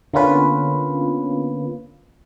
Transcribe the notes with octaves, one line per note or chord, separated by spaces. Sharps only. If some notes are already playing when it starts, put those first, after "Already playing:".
D3 A#3 B3 C#4 F4 B4